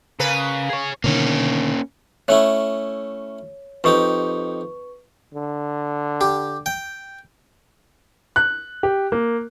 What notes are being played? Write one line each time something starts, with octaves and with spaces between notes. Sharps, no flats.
C#3 A#3 B4
G#4 C#5
B2 D3 D#3 A#3 C#4
A3 C#4 E4 C#5
F2 D#4 G4 B4 C#6
D3
G4
G5
F#6
G4
A#3